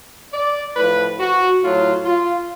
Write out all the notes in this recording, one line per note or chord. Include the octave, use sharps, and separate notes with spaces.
D5
A2 F3 B4
F#4
A2 F#3 F4
F4